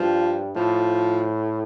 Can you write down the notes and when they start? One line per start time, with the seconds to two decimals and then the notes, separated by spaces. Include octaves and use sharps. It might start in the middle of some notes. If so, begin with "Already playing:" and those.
Already playing: G2 F3
0.56 A2 F3